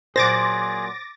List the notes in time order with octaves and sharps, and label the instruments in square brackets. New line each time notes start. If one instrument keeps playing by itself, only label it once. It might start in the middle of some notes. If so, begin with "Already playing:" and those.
[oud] A#2 F#3 [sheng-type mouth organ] G#4 [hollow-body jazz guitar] C5 [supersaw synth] D6 A6 A#6